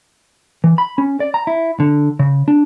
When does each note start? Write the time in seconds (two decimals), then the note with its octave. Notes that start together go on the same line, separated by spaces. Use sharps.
0.64 E3
0.78 B5
0.98 C#4
1.20 D5
1.34 A#5
1.47 E4
1.80 D3
2.19 C#3
2.48 D4